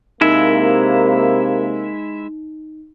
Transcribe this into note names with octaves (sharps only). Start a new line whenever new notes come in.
C3 G#3 A#3 D#4 E4 E5